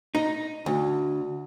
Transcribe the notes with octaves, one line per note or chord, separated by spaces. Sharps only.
D#4
D2